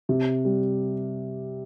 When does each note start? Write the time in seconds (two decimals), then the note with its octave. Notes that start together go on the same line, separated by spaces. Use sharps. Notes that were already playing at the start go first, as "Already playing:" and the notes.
0.09 C3
0.45 G3